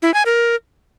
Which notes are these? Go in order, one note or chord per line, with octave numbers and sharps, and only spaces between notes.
E4
G#5
A#4